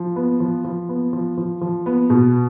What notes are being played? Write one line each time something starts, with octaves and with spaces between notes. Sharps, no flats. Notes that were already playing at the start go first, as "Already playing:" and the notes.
Already playing: F3
B3
F3
F3
B3
F3
F3
F3
B3
B2